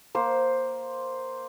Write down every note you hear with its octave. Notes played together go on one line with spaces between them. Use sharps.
A#3 C5